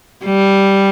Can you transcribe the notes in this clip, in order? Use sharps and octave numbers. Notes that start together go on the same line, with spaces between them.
G3